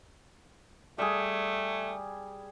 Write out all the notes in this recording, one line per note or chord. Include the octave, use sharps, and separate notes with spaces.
G3 A3 G#4